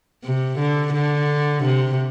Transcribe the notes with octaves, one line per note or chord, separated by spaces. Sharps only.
C3
D3
D3
C3